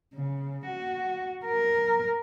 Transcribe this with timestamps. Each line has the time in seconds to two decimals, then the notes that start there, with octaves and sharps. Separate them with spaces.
0.14 C#3
0.66 F#4
1.46 A#4